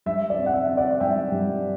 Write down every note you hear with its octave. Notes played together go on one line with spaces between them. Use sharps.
G2 E5
D5
C4
F#5
E5
C4
D5 F#5
G2 E5 G5
G2